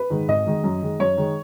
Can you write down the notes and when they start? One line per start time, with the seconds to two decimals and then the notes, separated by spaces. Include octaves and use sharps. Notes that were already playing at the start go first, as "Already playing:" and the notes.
Already playing: B4
0.10 G#2 D#3 G#3
0.28 G#1 D#5
0.46 G#2 D#3 G#3
0.64 F#2
0.82 D#3 G#3
1.00 F#2 C#5
1.17 D#3 G#3